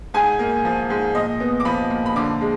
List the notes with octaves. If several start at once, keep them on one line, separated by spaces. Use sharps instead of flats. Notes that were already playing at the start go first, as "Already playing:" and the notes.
G#2 G#5
A#3
F3
G#2
A#2 D#5
B3
D6
F3 B5
A#2
B5
D3 D6
G#3